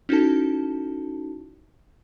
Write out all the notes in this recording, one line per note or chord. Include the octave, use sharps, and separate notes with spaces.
C#4 D#4 E4 F#4 A4 A5